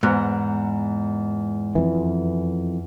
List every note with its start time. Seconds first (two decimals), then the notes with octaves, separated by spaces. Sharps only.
0.03 E2 G#2 A#5 F#6
1.75 F2 E3